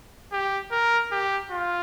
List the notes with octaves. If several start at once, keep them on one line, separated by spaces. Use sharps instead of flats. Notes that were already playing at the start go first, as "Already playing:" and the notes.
G4
A#4
G4
F4